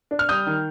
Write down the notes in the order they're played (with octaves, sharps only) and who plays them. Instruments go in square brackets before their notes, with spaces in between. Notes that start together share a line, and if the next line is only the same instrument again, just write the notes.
[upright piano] D4
F6
G3 D#6 G6
D#3